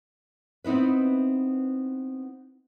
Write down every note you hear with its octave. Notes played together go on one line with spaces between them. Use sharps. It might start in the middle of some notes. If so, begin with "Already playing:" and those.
B3 C4 D#4 E4 B4